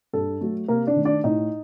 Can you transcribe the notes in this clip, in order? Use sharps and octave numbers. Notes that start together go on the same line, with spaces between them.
G2 A4
F#3 A3
C3 A#3 A#4
D4 D5
D#3 A3
D4 D5
A2 D#4 D#5